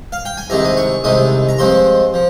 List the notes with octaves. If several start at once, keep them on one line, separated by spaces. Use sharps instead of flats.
F5
G5
G#5
C2 C3 D#3 G#3 A#5
D#6
C#6
C2 C3 D#3 G#3 D#6
A#5
G2 F3 G#3 C4 C6
F3